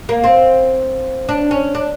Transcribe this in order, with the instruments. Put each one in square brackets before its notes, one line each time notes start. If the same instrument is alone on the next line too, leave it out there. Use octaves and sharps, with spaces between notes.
[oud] A#3
C4
D4
C#4
D4